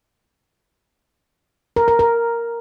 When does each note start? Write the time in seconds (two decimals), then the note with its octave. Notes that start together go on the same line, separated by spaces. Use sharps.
1.76 A#4
1.88 A#4
1.99 A#4